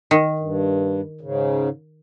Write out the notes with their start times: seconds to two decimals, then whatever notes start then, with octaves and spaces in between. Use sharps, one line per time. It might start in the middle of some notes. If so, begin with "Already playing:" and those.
0.11 D#3
0.39 G2
1.21 G#2 C#3